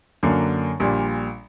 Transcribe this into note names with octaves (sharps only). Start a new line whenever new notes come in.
F#2 D3 A#3
A#1 A#2 G3